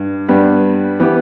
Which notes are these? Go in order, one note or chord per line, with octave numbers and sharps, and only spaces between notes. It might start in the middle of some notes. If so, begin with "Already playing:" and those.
Already playing: G2
G2 G3 B3
E3 B3 G4